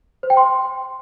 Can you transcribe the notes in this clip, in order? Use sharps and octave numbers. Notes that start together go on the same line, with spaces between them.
C5
G5
C6